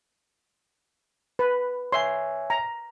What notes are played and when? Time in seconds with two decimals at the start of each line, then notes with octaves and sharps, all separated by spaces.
1.39 B4
1.92 C#5 E5 G#5 C6
2.50 A#5